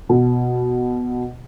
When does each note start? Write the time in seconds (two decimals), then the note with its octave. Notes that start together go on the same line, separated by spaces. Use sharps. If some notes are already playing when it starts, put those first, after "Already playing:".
0.09 B2